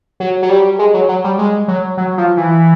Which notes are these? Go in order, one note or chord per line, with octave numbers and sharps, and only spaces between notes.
F#3
F#3
G3
G#3
F#3
F#3
G3
G#3
F#3
F#3
F3
E3